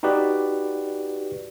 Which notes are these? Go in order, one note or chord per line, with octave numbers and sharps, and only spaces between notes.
D#4 F#4 G4 B4 D5